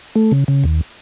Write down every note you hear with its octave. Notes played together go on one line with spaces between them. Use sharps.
A3
C#3
C#3
D#2